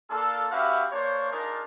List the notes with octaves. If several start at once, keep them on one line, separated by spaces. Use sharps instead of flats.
A#3 D4 F4 A4
C#4 F#4 G4 B4 E5 F5
A#3 D4 C5 C#5
D4 D#4 F4 G#4 A#4